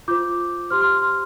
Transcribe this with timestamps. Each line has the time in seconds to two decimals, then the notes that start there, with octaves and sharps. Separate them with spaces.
0.08 F4 C5 D6 G6
0.70 G4 C5 C6 F6
0.82 C6 F6
1.02 C6 F6